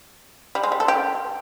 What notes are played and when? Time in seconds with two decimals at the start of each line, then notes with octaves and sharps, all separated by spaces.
0.55 G3
0.63 G#3
0.72 G3
0.80 A4
0.88 G4